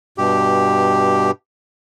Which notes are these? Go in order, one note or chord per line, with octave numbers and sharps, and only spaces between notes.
G2 B2 G4